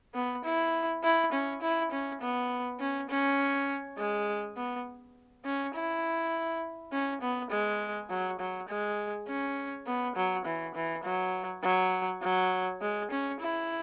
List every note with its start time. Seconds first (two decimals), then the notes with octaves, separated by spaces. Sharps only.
0.15 B3
0.44 E4
1.03 E4
1.32 C#4
1.62 E4
1.91 C#4
2.21 B3
2.80 C#4
3.09 C#4
3.98 G#3
4.57 B3
5.45 C#4
5.74 E4
6.92 C#4
7.22 B3
7.51 G#3
8.10 F#3
8.40 F#3
8.68 G#3
9.28 C#4
9.87 B3
10.16 F#3
10.46 E3
10.75 E3
11.04 F#3
11.63 F#3
12.22 F#3
12.81 G#3
13.11 C#4
13.40 E4